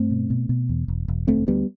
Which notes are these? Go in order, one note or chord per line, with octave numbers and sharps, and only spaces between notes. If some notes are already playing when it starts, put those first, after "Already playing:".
Already playing: G2 A3 C4
B2
B2
B2
E2
E1
E1
D2 A3 C4
D2 G3 B3